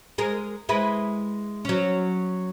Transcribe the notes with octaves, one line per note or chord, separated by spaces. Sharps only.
G#3 G#4 A#4
G#3 E4 B4
F#3 C#4